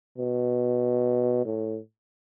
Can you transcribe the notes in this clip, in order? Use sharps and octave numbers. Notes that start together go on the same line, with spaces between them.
B2
A2